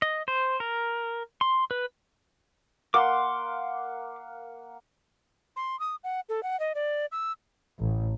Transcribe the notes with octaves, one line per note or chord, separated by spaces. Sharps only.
D#5
C5
A#4
C6
B4
A#3 F5 F#5 C6 D6
C6
D#6
F#5
A4
F#5
D#5
D5
E6
A1